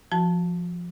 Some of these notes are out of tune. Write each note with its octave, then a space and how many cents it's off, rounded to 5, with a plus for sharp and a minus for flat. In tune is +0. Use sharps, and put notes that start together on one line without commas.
F3 +0 F#4 +0 A5 +0